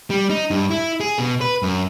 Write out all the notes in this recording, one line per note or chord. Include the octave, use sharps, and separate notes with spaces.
G3
D#4
G2
E4
G#4
B2
B4
F#2